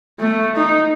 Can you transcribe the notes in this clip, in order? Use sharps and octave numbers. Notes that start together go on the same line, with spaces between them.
A3
D#4